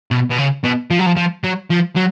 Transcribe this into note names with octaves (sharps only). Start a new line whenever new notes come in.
B2
B2
C#3
B2
F3
F#3
F3
F3
F#3
F3
F#3